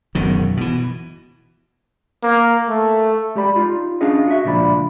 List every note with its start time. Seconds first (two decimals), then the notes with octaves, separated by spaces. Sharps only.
0.15 E1 F#2 B2 D#3
0.57 B2 E3
2.23 A#3
2.69 A3
3.35 G#3 G4 D5 B5
3.56 D#4 F4
4.01 C#4 D4 F4 G#4 D#5
4.28 F#4 D#5 E5
4.45 C#2 A#2 F3 D4 B5